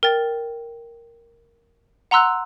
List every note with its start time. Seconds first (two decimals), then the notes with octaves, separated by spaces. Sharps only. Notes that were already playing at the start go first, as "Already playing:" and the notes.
0.03 A#4 G5 A6
2.11 F#5 A#5 C6 E6 F#6